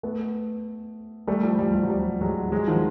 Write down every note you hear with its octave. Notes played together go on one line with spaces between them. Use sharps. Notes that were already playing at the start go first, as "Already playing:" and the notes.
A3 B3
G3 A3
F3 G3
F3 G3
F3 G3
F#3
F3 G3
F#3 G#3
F#3 G#3
D#3 F3